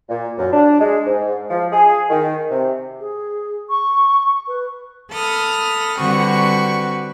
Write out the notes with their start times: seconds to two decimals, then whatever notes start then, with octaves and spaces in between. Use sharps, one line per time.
0.09 A#2
0.38 F#2
0.53 D4
0.80 G#3
1.07 G#2
1.50 F3
1.72 G#4
2.09 D#3
2.50 C3
3.00 G#4
3.69 C#6
4.47 B4
5.10 A4 B5 D#6 F6
5.99 D3 G3 C4 F#4 B4 C#6